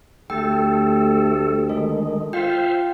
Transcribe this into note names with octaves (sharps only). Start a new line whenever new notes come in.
D2 A3 G4 A4 G5
D#3 G#3 A4
F4 C5 E5 F5 G5